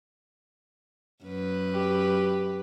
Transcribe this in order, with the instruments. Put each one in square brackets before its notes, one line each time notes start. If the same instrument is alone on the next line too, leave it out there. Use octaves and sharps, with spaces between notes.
[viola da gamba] F#2 B4
[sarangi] G4